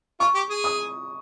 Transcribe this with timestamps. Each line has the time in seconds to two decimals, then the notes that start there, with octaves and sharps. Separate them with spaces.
0.20 F4 C#6
0.35 G4
0.50 G#4
0.64 D#6